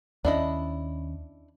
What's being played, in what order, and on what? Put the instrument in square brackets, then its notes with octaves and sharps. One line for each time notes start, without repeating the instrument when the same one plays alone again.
[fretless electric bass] D#2 C#4 [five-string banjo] D4 E4 D#5